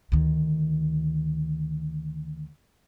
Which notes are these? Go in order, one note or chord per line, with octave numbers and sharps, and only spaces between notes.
D2 D#3